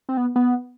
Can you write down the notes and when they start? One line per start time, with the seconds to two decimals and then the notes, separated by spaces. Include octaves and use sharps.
0.09 C4
0.17 B3
0.36 B3